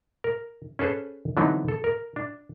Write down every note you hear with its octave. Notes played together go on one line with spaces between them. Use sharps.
A#4
C#4 G#4 A4 B4 C5
D3 E3 F#3 B3 C4 D#4
A4
A#4
D4